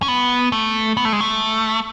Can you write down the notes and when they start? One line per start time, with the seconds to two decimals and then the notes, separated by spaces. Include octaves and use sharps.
0.02 C#4
0.08 B3
0.52 A3
0.97 B3
1.05 A3
1.13 G#3
1.21 A3